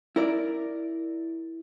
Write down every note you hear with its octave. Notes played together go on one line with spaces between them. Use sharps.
E4 A#4 D5